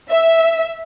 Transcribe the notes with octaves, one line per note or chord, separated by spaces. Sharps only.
E5